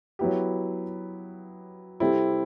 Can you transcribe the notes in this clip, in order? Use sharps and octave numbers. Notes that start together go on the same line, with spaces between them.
F#3 B3 E4 G4
C3 G3 C4 E4 A4